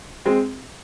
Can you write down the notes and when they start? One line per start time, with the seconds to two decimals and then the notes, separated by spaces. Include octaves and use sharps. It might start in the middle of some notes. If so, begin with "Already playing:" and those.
0.25 G#3 C4